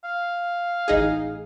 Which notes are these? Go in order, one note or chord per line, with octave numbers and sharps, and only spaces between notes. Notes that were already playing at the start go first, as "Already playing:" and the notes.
F5
A1 D#4 G#4